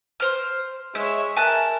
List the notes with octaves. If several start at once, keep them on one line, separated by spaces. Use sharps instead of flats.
C5 F6
G#3 C#5 E5
A#4 E5 G#5 A5 F#6